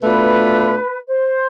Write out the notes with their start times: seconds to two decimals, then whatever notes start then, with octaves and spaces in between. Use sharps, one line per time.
0.01 B2 A3 D4 F4 B4
1.08 C5